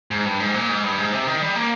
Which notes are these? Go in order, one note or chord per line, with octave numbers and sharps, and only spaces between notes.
G#2
G2
G#2
A#2
G#2
G2
G#2
C3
D#3
G3
A#3